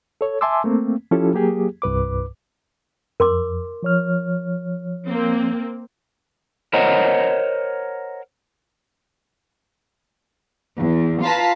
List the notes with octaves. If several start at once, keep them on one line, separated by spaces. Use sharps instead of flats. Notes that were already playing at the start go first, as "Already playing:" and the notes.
A4 C#5
E5 G#5 A5 C6 D6 E6
A3 A#3 C4
F3 C#4 E4 F4 G4 A4
F#3 A#3 G4 G#4
C2 G2 B4 D6
F2 A#4 C6 D6
F3 C#5 F6
A#3 C4
A#4 C5 C#5 D#5 F#5 A#5
E2
F4 B4 F5 A5 A#5 B6